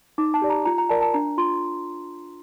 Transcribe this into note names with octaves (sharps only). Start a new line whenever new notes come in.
D#4 D6
A5
G4 D5
A#5
F4 A#5
A#5
A#4 D5 A5
A5
D4 A#5
F4 C6